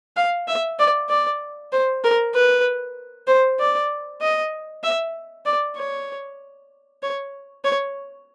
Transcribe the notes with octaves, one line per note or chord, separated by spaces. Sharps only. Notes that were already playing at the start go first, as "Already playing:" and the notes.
F5
E5
D5
D5
C5
A#4
B4
C5
D5
D#5
E5
D5
C#5
C#5
C#5